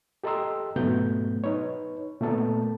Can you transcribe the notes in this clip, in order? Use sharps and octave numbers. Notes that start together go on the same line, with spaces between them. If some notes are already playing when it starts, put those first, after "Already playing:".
G4 A4 D#5 A#5 C6 E6
G#2 B2 F#3 A3 B3 G6
D#4 B4 C#5
A#2 A3 B3 A4 A#4 A5